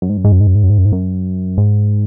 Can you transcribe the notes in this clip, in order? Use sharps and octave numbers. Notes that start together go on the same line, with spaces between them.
F#2
G#2
F#2
G#2
F#2
G#2
F#2
G#2
F#2
G#2
F#2
G#2
F#2
G#2